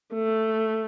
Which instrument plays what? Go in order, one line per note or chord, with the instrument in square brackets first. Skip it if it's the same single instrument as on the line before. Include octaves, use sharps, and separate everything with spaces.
[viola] A3